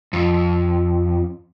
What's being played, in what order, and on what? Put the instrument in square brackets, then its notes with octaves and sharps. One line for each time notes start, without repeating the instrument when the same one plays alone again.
[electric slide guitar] F2